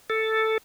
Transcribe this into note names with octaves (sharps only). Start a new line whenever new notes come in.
A4